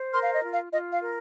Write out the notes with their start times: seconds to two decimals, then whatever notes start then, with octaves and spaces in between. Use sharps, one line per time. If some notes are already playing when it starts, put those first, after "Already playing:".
Already playing: C5
0.13 A#4 C6 F6
0.23 F5
0.33 D#5
0.42 F4
0.52 F5
0.72 F4 D#5
0.92 F5
1.02 A#4